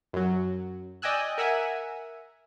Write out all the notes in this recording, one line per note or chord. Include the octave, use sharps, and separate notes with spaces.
F#2 F#3
D5 D#5 G5 G#5 E6 F#6
A#4 E5 F#5 G#5